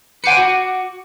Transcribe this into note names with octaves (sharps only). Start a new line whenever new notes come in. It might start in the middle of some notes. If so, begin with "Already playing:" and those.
B4 C5 F#5 G#5 D6 C#7
F#4